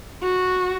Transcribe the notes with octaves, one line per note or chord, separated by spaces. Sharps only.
F#4